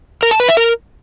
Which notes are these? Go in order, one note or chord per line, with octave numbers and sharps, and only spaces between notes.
A#4
A5
B4
E5
A#4